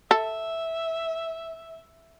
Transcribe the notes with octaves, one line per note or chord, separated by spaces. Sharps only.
A4 E5